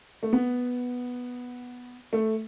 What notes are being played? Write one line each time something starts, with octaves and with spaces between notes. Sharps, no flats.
A3
B3
A3